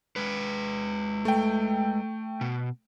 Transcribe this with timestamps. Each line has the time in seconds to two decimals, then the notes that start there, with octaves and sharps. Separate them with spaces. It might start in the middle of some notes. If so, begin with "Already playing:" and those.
0.16 G#3 B4
1.25 A3 G5
2.41 B2